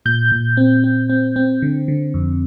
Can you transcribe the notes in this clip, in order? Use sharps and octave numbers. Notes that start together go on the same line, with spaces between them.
A#2 G6
A#2
C4
C4
C4
C4
D3
D3
F2